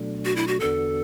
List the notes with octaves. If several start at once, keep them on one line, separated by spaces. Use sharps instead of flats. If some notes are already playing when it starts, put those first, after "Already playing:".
Already playing: B2 F#3 A3 D4
F#4
E4
F#4
E2 D3 B3 D4 F#4 A4